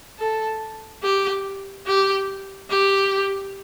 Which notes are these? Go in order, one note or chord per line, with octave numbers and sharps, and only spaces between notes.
A4
G4
G4
G4